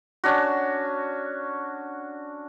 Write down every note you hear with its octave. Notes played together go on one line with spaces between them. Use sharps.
C#4 D4 F#4